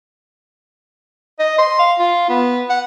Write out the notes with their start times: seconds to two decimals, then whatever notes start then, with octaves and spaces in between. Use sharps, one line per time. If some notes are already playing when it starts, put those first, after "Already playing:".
1.40 D#5
1.59 C6
1.79 F5
1.99 F4
2.30 B3
2.70 F#5